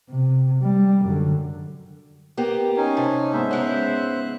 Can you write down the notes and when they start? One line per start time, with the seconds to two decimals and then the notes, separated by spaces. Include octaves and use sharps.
0.10 C3
0.63 G3
1.06 F#2 D3
2.37 A#3 B3 G4
2.77 C#4 D#4 G#5
2.97 C3 A5
3.33 G#2 B3 C5 E5
3.51 C#3 G#3 C#4 F#6